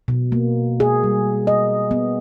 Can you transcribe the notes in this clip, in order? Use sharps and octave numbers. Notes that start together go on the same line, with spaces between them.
B2
A#3
G#4
G3
D#5
B3